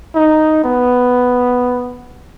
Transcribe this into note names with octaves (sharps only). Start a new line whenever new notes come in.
D#4
B3